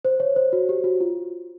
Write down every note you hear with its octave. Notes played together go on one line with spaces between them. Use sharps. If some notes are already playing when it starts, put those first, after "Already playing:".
C5
C#5
C5
F#4
G4
F#4
F4